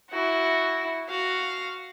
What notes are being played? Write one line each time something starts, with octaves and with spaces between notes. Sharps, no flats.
E4 F#4
F#4 F5